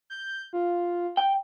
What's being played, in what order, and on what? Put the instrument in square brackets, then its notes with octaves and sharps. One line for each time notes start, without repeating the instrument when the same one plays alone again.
[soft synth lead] G6
F4
[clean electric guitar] G5